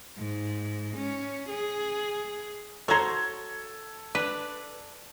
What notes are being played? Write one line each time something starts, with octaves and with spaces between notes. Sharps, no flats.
G#2
C#4
G#4
F#4 A4 C5 C#5 A#5 G#6
D4 B4